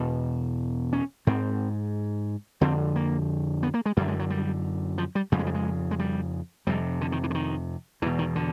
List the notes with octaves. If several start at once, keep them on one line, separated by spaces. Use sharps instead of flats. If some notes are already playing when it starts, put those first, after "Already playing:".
Already playing: E2 B2
C#4
G#2 C4
F2 D3 C4
A#3
B3
A#3
G#3
F#2 D3 G3
G#3
F#3
G3
F3
G3
F2 C#3 A3
G#3
G3
G#3
G#3
G3
F2 C3 G3
D3
D#3
E3
D3
D#3
E2 B2 E3
D#3
D3